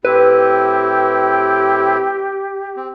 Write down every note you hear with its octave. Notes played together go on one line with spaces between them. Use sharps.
A2 C4 E4 G4 B4
C4